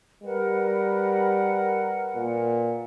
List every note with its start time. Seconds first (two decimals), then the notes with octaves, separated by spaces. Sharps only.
0.24 G3 A#4 B4 F#5
2.16 A#2